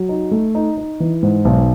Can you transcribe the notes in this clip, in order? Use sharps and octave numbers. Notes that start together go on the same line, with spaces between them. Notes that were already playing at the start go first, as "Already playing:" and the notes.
Already playing: F#3
D#4
A3
D#4
D#4
E3
G#2
B1